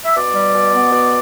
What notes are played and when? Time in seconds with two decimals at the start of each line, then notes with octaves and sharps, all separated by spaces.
0.05 E5
0.15 B2 D5
0.35 G3
0.54 B2
0.73 B3
0.92 B2